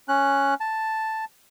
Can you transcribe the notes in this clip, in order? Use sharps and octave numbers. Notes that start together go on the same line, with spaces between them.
C#4 F#6
A5